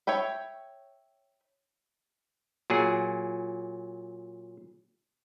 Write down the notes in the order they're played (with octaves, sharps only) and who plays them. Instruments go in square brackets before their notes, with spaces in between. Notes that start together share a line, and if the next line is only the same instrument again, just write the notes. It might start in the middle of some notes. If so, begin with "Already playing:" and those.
[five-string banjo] C#5 E5 G5 B5
[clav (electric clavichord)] A#2 F#3 G#4